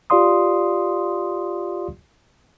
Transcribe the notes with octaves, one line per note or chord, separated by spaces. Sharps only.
F4 G4 D5 F5 C6 D#6